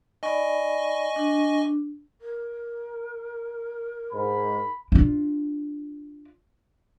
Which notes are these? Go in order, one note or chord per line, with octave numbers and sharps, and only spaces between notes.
D#4 D5 D#5 G#5 B5 C#6
D4
A#4
G#2 B5
D4 F4